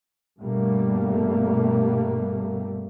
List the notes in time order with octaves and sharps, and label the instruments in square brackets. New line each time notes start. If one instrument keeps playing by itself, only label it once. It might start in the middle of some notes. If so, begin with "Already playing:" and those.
[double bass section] G2 B2 G3 A3 A#3